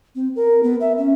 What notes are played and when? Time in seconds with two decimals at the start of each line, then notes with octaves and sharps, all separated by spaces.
0.15 C4
0.36 A#4
0.63 B3
0.80 E5
0.98 C#4